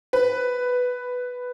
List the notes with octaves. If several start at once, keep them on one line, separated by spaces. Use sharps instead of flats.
B4